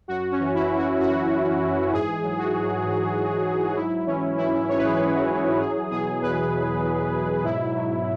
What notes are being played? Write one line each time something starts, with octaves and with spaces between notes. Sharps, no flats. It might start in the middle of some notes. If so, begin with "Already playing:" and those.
F#2 F#4
C#4
E3
E4
E3
F#4
F#2 F#4
F#2
E3
G#2 G#4
F#3
F#4
F#3
G#2
G#2
F#3
G#2 E4
E3 C#4
E3 E4
G#2 C#5
B4
G#4
B4
G#2
F#4
E3
F#3 G#4
B2 G#4
E2 B4
E2
F#3
B2
G#2 E4
F#3